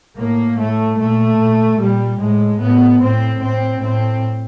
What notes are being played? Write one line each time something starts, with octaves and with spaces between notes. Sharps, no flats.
A2 A#3
A2 A3
A#2 A3
A#2
A#2 G3
A2 G#3
A2 B3
A2 C4
A2 C4
A2 C4